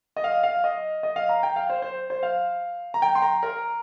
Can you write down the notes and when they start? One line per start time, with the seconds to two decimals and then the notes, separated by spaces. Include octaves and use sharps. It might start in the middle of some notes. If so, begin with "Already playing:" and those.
0.17 D#5
0.24 F5
0.43 F5
0.64 D#5
1.03 D#5
1.16 F5
1.29 A#5
1.43 G5
1.56 F5
1.70 C5
1.82 C5
2.10 C5
2.23 F5
2.94 A#5
3.02 G5
3.15 C6
3.22 A#5
3.43 A#4